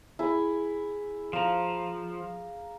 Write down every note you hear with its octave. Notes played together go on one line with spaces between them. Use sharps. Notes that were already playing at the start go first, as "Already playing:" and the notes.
E4 G#4
F3 F5 A#5